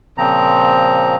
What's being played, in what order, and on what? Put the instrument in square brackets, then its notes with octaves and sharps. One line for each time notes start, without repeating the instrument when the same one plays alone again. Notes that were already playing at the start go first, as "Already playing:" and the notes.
[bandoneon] A#2 C#3 F3 C4 A#5